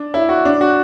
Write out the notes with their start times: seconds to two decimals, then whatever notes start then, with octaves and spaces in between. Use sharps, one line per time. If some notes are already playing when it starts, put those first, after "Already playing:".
Already playing: D4
0.14 E4
0.29 F#4
0.45 D4
0.61 F#4